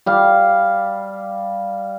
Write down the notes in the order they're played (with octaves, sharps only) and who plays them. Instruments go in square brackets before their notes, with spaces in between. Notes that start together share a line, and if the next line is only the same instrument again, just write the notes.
[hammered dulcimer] G3 F5